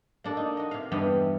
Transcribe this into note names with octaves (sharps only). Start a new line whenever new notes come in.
A#3 D4 A4
D#4
F#4 D#5
C3 F5
E2 G2 B3 E4 G4 F5